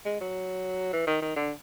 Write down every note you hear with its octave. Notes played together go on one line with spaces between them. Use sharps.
G#3
F#3
E3
D#3
D#3
D3